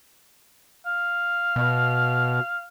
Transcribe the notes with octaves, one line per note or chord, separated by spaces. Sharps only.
F5
B2